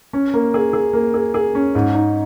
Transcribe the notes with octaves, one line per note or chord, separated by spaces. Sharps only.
C#4
A#3
G#4
G#4
A#3
G#4
G#4
C#4
G#2
D#4